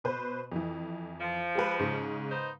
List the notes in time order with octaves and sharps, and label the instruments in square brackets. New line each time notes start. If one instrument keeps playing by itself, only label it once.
[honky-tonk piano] B2 B4 C5
F2 E3
[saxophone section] F3
[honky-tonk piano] G#3 G4 B4
G#2 C#3
[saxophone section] B3 D#4 C5